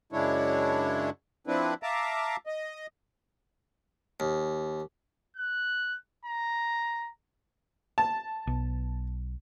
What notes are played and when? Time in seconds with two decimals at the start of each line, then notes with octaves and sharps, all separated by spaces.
0.13 F#2 C#3 G#3 D4 E4 C#5
1.47 F3 C4 D4 E4 B4
1.83 E5 F5 A5 A#5 D6
2.46 D#5
4.20 D#2
5.37 F#6
6.25 A#5
7.98 A5
8.47 B1